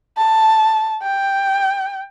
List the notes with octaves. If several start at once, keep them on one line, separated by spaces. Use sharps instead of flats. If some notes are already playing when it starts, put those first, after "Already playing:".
A5
G5